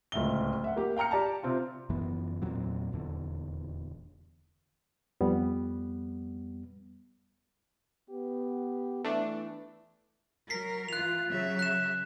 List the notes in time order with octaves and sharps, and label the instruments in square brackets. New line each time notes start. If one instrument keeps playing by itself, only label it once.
[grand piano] D1 C#2 E5 G7
E5 F#5
A#3 G4
F5 G5 A#5 F6 C#7
G4 D5 A5 A#5
C3 C4 F4
[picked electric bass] F#1 F#2 E3 B3
E2 A#2 F#3 C4
D#1 E2 D3
[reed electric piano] F2 G3 B3
[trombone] B3 [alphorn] G4
[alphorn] E3 [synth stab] A3 D4
[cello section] F#3 A#4 [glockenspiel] B6 C7
[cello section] E3 F4 [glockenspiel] F#6 F7
[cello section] C#3 F#3 E5
[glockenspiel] F#6 E7